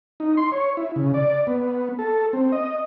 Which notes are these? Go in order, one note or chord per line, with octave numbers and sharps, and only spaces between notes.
D#4
C6
C#5
E4
C#3
D5
B3
A4
C4
D#5